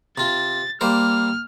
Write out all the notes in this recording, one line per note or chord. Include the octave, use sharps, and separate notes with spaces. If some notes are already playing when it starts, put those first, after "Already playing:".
C3 F4 A6
G3 A#3 C5 F6